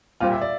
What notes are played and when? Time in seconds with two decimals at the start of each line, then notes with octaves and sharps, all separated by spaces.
0.20 A#2 G3 C4 F4 G4
0.32 E5
0.42 D5